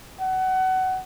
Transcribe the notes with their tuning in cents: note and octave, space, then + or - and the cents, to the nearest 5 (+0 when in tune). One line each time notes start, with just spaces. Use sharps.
F#5 +25